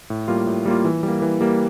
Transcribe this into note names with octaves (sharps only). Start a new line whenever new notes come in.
A2
G3 A#3 F4
A2
G3 A#3 F4
E3
G3 A#3
E3
G3 A#3